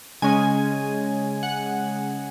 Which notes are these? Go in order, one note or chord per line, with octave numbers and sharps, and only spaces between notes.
C#3 G#3 C#4 G#5
F#5